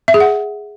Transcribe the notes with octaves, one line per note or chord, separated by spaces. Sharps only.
E5
G#4
F#5